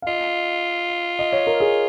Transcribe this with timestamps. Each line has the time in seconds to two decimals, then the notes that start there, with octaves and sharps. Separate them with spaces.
0.02 F5
0.07 F4 D#5
1.19 D#5
1.33 C#5
1.47 A#4
1.60 G#4